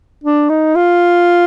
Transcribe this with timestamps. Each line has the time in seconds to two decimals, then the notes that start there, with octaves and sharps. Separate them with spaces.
0.24 D4
0.50 D#4
0.76 F4